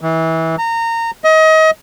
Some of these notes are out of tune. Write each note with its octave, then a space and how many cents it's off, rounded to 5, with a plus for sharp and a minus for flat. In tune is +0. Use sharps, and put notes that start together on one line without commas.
E3 -25
A#5 -25
D#5 +30